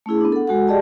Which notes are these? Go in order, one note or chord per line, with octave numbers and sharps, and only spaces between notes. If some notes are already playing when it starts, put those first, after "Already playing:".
A3 C#4 E4 G#4
B3 D4
A4 F#5
G#3 F#4 A4 F#5
G4 G#4 D5 D#5 G5 A5